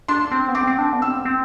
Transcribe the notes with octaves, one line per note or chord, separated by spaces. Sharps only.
D4 C6
C4
B3
C4 D6
C4
D4
B3
C4 E6
C4